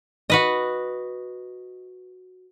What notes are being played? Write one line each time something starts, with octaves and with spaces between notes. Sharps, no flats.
F#4 B4 D#5